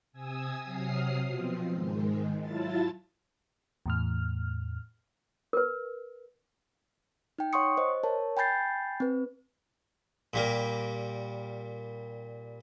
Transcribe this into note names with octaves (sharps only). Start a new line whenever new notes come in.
C3 G#5 D#6 E6
C3 F#3 D#6 F6 C7
B2 F3 C4
G#2 D#3 G#3
F#3 E4 F4 A5 A6
E2 A2 F6
A#4 B4
D#4 G5
C#5 F#5 C6 C#6 D#6 C#7
C5 D#5
A#4 C#5 A5
G5 G#5 B5 G6 A6 C7
C4 B4
A#2 G3 A#4